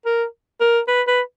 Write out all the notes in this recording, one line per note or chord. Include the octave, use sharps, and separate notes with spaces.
A#4
A#4
B4
B4